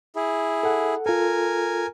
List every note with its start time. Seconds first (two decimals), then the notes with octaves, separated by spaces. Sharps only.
0.16 E4 G#4
0.63 A4 F#5
1.06 F4 A4 A#4 G#5